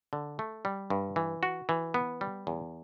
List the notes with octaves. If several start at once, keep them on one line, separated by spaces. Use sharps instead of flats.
D3
A3
G3
G2
E3
F#4
E3
B3
G3
E2